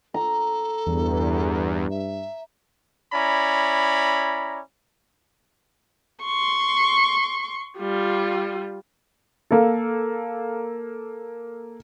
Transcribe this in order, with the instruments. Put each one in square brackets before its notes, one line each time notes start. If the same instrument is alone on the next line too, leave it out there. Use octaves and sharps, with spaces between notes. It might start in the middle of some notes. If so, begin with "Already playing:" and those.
[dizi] A4 [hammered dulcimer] A#5
[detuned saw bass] E2 [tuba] G2
[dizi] E5
[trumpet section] C#4 E4 D5 A#5 B5
[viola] C6 C#6
G3 F4
[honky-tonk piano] A#3 A4